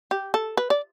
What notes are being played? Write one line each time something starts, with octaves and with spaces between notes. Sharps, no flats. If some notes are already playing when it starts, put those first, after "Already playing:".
G4
A4
B4
D5